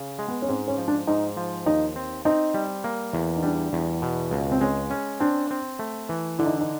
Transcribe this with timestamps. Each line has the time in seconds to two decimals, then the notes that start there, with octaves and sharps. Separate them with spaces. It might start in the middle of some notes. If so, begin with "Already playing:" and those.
Already playing: C#3
0.19 G#3
0.28 B3
0.42 C#4
0.48 G#2 C4
0.68 C#4
0.78 F3
0.88 D4
1.07 G#2 D#4
1.37 F3
1.66 D#2 D#4
1.96 C4
2.25 C4 D#4
2.54 G3
2.84 A#3
3.13 E2
3.37 D#4
3.43 G3 D4
3.73 E2
4.02 B2
4.31 C#2
4.52 C4
4.61 G#3 C#4
4.90 C#4
5.20 C4 D4
5.51 C4
5.79 A3
6.09 E3
6.39 D3 E4
6.46 D#4
6.53 D4
6.61 D#4